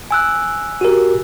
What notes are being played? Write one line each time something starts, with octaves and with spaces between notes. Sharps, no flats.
G#5 E6 F#6
F#4 G4 A#4